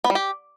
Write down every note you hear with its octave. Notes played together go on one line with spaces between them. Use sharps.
B3
G3
G4